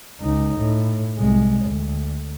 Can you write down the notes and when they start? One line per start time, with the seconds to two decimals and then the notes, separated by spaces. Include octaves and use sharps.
0.21 C#2 D#4
0.60 A2
1.18 C2 G#3
1.65 D2